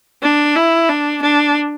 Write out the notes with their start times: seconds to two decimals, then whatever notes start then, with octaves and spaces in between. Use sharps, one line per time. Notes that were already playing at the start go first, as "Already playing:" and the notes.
0.23 D4
0.56 E4
0.89 D4
1.22 D4